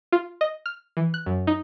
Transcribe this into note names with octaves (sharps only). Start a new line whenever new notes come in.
F4
D#5
F6
E3
F#6
F#2
D#4